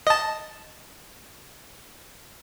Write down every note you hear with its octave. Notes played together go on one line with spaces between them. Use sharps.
D#5 A5